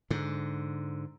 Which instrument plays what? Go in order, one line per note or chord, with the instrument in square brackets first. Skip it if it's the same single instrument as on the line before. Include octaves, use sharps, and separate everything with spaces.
[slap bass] G#2 D3